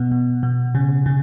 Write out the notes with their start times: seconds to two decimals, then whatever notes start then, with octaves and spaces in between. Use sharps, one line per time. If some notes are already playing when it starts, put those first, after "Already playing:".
Already playing: B2 B3
0.11 B2
0.43 B2
0.75 C#3
1.06 C#3